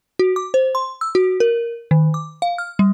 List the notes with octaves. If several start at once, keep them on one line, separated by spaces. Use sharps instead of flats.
F#4
D6
C5
C6
E6
F#4
A#4
D#3
D6
F5
F6
G3